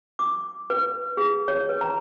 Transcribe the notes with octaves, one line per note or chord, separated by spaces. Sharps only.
D6
B4
G#4
C#5
B4
A#5